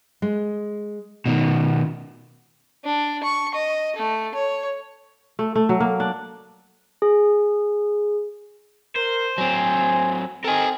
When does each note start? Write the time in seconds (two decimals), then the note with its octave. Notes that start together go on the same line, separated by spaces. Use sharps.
0.22 G#3
1.26 B2 D#3
2.84 D4
3.23 C#6
3.55 D#5
3.96 A3
4.34 C#5
5.39 A3
5.55 A3
5.69 F#3
5.80 A#3
6.00 D4
7.02 G#4
8.96 A#4 C5
9.38 F#3 C4 G#5
10.44 C4 A4 A#4 D#5 G#5